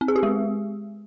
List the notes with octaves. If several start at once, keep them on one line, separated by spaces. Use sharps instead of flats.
C4
G#4
G4
G#3